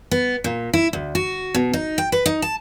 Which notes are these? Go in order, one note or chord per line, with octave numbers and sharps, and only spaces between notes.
B3
A#2
E4
D2
F#4
B2
D#4
G5
B4
D#4
A5